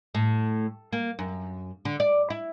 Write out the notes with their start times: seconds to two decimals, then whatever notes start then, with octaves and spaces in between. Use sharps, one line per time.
0.15 A2
0.93 A#3
1.19 F#2
1.85 D3
2.00 D5
2.30 E4